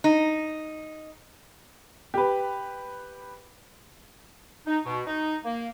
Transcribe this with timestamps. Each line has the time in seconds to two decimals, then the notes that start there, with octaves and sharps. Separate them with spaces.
0.04 D#4
2.14 G4 B4
4.67 D#4
4.85 B2
5.07 D#4
5.45 A#3